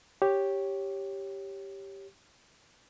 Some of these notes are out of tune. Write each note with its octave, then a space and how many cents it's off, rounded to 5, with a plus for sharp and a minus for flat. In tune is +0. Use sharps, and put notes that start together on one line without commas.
G4 +0 C#5 -5